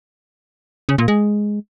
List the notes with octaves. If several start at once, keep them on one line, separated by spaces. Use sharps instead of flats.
C#3
A#2
G#3